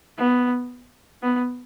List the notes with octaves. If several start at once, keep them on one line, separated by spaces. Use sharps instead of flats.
B3
B3